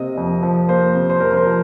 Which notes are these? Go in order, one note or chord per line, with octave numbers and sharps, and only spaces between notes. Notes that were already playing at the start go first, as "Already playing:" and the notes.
Already playing: C3 A#3 D#5
F2
F3
A#3 C5
C3
C5
F2 A#4
C5
A#4
F3